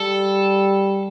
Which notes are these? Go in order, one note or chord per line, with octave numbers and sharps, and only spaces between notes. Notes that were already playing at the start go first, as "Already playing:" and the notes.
Already playing: G3 A4